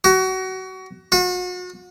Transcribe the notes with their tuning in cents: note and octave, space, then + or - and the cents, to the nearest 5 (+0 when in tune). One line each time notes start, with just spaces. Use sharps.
F#4 +25
F#4 -40